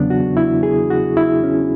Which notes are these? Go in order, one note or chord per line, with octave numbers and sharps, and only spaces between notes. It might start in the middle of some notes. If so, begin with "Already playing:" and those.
Already playing: E2 C#3 F#3 B3 D4
F#4
E4
G#4
F#4
E4
C#4